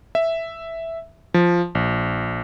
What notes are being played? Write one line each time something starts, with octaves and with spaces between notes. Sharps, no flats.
E5
F3
A#1